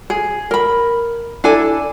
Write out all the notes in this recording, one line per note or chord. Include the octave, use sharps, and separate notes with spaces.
G#4
A#4 B5
D4 E4 A4 G#5